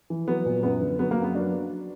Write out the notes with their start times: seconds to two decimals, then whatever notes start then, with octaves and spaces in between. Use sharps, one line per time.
0.10 E3
0.28 F#3 B3
0.46 A#2
0.63 F#2 B3
0.81 D3
0.99 F#3 B3
1.11 A#3
1.18 F#2
1.24 B3
1.35 F#3 D4
1.53 F#3